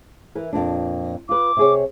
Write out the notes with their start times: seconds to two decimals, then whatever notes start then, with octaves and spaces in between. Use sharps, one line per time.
0.35 E3 E4 A#4
0.53 F2 A#2 D4
1.29 F4 B4 D6
1.57 C3 G#4 C#5